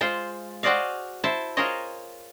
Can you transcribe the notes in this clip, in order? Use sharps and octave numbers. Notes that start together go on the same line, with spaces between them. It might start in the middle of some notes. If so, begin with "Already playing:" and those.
G#3 F4 C5
F#4 G#4 C5 D5 D#5 F5
E4 C5 A5
F4 G#4 A#4 C5 C#5 D#5